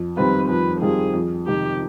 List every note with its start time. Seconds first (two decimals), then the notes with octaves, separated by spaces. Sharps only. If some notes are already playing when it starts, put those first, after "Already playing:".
Already playing: F2
0.16 D#3 G3 C4 F4 B4
0.48 F2 B4
0.81 D#3 G3 C4 F4 G#4
1.13 F2
1.46 C3 D#3 G4